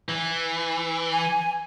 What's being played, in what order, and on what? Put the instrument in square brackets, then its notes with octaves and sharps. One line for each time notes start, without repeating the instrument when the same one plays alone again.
[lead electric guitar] E3
[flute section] G#5